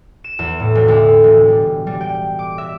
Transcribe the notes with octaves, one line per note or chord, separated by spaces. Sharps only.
E7
E2
A2
E1
D2
E1
G3
G3
G5
D6
E5